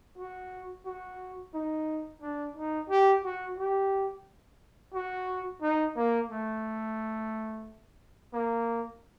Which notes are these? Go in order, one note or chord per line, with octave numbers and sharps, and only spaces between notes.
F#4
F#4
D#4
D4
D#4
G4
F#4
G4
F#4
D#4
A#3
A3
A#3